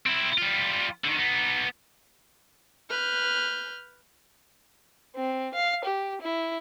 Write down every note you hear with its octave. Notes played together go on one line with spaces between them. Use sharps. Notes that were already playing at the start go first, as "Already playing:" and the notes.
C4 E4
G3 F4
D3 D#3
B3 D#4
B4 F6 G6
C4
F5
G4
E4